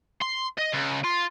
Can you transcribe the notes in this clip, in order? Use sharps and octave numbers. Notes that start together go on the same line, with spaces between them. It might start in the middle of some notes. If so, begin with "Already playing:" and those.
C6
D#5
C#2
F4